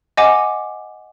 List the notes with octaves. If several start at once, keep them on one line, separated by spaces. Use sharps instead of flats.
D#5 F#5 G#5 D6